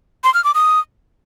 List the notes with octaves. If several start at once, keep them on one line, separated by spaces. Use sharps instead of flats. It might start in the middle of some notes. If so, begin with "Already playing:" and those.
C6
F6
D6
D#6